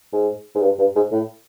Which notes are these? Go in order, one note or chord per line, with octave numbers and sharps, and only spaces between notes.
G#2
G#2
G2
G2
G#2
A2